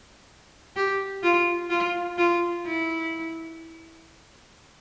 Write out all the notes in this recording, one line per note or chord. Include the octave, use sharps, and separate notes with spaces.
G4
F4
F4
F4
E4